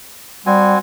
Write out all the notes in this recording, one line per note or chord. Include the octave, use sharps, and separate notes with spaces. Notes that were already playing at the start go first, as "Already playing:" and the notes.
G3 C4 F#4 G#5